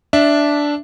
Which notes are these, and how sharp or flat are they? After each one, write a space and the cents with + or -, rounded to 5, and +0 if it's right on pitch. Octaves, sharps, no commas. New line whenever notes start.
D4 -5 E5 +0